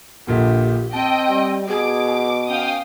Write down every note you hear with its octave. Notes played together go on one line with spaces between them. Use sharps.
A#1 A#2 D3 G4
C4 D#5 G5 A5
G3
B2 G#4 D6
C#4 F5 G5 D#6